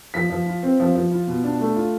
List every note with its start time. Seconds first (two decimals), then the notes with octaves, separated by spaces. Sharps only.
0.14 F3 B6
0.30 F3
0.46 F4
0.63 C4
0.80 F3
0.95 F3
1.11 F4
1.27 B2
1.44 D4
1.60 A3
1.76 F4